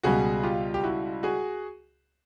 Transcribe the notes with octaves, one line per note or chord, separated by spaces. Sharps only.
C#2 B2 G3 F#4 G#4
F4 G4
G4
E4 F#4
F#4 G#4